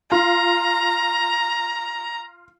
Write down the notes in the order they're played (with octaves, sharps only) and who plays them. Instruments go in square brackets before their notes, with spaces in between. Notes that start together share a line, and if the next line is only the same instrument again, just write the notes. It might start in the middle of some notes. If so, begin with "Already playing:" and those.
[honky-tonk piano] F4 [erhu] A#5